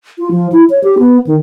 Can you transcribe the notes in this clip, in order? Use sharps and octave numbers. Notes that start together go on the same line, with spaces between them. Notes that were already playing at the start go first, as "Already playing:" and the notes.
F4
F3
E4
C#5
G4
B3
D#3